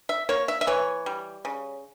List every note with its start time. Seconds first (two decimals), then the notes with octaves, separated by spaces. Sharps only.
0.09 E5
0.29 A#3 C#5
0.48 E5
0.61 E5
0.67 E3 C#5
1.06 G3
1.45 C#3